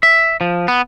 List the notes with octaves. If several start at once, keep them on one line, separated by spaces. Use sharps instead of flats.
E5
F3
B3